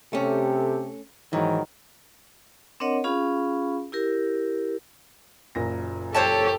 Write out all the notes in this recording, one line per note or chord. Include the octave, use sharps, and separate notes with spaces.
C3 A3 C#4 G4 A4
G#2 D#3 E3 F#3
C4 D4 A#4 C#5 D#5 F#5
C#4 F4 G#4 F5 B5
E4 G4 A#4
F#1 A#2 A#6
G4 A4 C5 C#5 A5